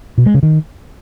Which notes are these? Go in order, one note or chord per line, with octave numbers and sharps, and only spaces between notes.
B2
G#3
C#3
D#3